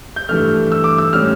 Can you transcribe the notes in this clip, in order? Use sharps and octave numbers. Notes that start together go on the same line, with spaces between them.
G6
G2 E3 A3 F6
E6
D6
E6
A2 G3 C#4 F6